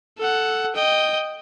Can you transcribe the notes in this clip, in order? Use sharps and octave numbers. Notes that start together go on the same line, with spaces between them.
A4 F#5
D#5 G5